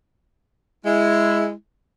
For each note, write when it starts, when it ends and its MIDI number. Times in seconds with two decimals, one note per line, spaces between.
0.84 1.51 56
0.84 1.51 64